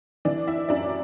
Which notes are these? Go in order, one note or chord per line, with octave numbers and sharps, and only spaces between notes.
E3 D4 D5
E4 E5
F#2 D4 D5